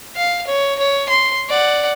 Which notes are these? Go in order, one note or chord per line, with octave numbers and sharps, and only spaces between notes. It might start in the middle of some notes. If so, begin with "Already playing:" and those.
F5
C#5
C#5
C6
D5 F#5